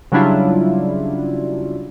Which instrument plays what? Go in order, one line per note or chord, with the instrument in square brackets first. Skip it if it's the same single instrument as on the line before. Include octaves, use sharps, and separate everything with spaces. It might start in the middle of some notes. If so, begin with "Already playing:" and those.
[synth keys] C#3 F#3 G3 D4 E4 F4